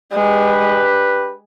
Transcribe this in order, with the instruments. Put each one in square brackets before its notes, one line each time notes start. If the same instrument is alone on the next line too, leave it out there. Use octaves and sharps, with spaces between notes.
[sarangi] G#3 [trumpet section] D4 G4 B4